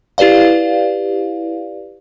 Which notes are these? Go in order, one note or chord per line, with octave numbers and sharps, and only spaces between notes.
E4 G4 B4 D5 F5